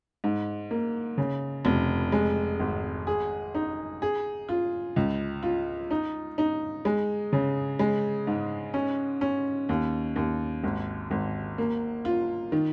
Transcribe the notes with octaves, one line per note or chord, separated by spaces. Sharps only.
G#2
A#3
C#3
F1
G#3
G#1
G#4
D#4
G#4
F4
C#2
F4
D#4
D#4
G#3
C#3
G#3
G#2
C#4
C#4
D#2
D#2
G#1
G#1
A#3
F4
D#3